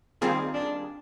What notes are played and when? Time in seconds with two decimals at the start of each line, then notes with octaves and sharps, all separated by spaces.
0.22 D#3 G3 A#3 C4 F4 G#4
0.54 D4